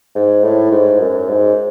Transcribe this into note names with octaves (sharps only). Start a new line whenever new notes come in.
G#2
A2
G#2
F#2
G#2